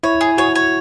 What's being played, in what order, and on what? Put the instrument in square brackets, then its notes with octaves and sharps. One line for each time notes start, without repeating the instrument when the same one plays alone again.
[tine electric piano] E4 [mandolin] C#5
[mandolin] G#4
[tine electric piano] F#4 [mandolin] C#5
[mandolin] C#5